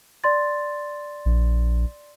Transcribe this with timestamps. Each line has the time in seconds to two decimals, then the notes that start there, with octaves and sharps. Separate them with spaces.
0.24 D5 C6 A6
1.26 A#1